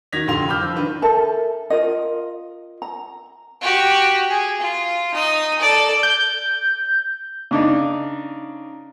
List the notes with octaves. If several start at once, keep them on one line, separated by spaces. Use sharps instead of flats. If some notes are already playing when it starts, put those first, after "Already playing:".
D#3 F#4 G#6 A#6 B6 F7
F1 D3 F4 G5 C6 F7
B5 D6 E6 F6 G6
F3
D#3 D4 B4
A4 A#4 E5 A5
F4 A#4 D#5
A#5
F#4 G4
G#4
F4
D#4 D#6
A4 D5
G6
C#3 D4 D#4